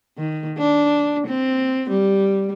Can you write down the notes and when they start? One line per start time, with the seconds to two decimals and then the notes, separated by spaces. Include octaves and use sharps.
0.18 D#3
0.58 D4
1.27 C4
1.90 G3